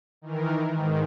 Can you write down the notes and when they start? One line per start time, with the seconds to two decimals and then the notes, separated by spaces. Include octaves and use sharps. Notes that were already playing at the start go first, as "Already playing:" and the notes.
0.22 D#3 E3 A#4
0.68 G#2 D#3